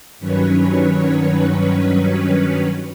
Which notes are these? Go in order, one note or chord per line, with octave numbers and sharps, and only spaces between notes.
G2 D#3 F#3 C#4 B4 C#5